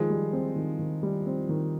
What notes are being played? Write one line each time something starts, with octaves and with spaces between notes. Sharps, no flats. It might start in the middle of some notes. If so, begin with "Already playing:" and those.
Already playing: D#3 F3 G#3
G3
C4
D#3
D#3
G3
C4
D#3